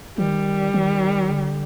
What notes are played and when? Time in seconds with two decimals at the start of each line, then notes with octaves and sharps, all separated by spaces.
0.18 D#3 G3
0.74 D#3
1.30 D3